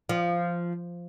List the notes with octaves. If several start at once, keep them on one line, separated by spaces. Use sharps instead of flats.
F3